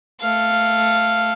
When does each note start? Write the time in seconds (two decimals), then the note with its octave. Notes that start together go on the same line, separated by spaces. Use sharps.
0.21 A3 F5